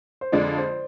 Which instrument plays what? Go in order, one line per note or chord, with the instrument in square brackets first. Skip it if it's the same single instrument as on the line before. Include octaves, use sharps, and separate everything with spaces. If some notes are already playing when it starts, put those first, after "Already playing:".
[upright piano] C5
[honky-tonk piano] F2 D3 G#3 D4 F4 [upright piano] D5
[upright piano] C5